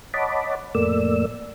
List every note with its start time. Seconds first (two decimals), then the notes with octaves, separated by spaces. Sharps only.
0.14 C#5 D#5 F#5 A5 B5 D6
0.75 F2 A2 A3 A#3 D5 E6